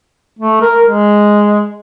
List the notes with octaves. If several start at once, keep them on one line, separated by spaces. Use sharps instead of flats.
A3
A#4
G#3